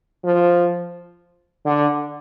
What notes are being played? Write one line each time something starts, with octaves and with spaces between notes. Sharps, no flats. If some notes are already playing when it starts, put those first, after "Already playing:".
F3
D3